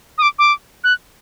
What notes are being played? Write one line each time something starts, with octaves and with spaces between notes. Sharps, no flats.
D#6
D6
D6
F#6